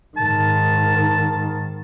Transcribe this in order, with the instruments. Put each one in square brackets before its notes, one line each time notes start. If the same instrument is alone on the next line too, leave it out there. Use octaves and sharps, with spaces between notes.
[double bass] G#2 D#3 [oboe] A5